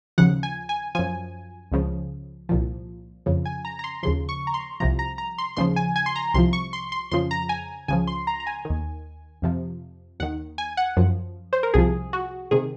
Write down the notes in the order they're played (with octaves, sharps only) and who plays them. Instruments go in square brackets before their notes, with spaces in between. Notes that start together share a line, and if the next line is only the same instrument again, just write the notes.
[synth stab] D#2 C#3 F3 F#5
G#5
G#5
F#2 F3 G#5
C#2 C#3 F3
C2 A#2 F3
F2 C#3 F3
G#5
A#5
A#5
C6
D#2 C#3 F3 C6
C#6
A#5
C6
C2 C3 F3 A#5
A#5
A#5
C6
D#2 C#3 F3 C6
G#5
G#5
C6
A#5
C2 C3 F3 C6
C#6
C6
C6
F2 C#3 F3 C6
A#5
G#5
C#2 C#3 F3 G#5
C6
A#5
A#5
G#5
D#2 D#3
F2 C3 F3
D#2 F#5
D#3
G#5
F#5
F#2 F3
C5
A#4
C2 C3 F3 G#4
F#4
C3 D#3 G#4